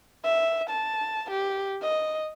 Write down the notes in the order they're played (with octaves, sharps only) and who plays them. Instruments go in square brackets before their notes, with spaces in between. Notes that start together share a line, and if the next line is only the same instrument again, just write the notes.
[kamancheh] E5
A5
G4
D#5